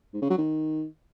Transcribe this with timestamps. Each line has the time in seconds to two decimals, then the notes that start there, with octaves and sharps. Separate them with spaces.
0.14 G#2
0.22 C#3
0.30 F#3
0.38 D#3